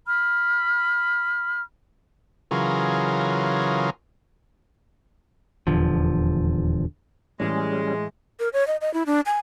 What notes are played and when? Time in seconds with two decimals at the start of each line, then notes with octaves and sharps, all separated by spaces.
0.07 B5 F6
2.51 C#3 E3 F#3 F4 G#4 A#4
5.67 D#1 E2 D3 F3
7.40 A2 E3 G3 G#3 C#4
8.40 A#4
8.53 C#5
8.67 D#5
8.81 D#5
8.94 E4
9.06 D4
9.26 G#5